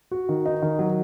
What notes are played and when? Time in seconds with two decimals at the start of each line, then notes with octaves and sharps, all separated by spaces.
0.11 F#4
0.29 D#3
0.46 D#4
0.62 D#3
0.79 F#3